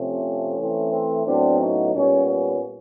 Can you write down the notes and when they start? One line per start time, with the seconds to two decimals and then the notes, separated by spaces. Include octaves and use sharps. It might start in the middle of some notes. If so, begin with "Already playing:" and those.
Already playing: C3 F3 A3 C4 C#4
0.58 E3 A3 C4
0.91 C4
1.25 A2 F#3 B3 C4 D4
1.59 C#4 D#4
1.93 A#2 G3 B3 C#4
2.27 C#4